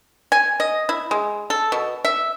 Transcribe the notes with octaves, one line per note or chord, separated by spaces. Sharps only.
G#5
D#5
E4
G#3
A4
B2
E5